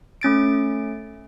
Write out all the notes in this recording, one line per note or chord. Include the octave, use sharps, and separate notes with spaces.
A3 C#4 A6 D7